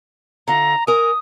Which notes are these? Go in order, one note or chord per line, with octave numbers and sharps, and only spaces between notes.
D3 F4 A#5
A#4 G#5 D#6